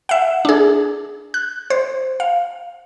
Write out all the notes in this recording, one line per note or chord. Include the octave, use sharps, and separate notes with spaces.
E5 F#5
D4 G#4
F#6
C5
F5